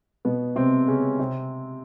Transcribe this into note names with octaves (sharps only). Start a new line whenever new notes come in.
B2 B3
C3 C4
C#3 C#4
C3 C4